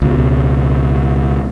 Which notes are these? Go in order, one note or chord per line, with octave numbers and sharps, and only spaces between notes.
C#2 B2